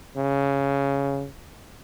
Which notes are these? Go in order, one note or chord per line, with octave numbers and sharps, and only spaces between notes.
C#3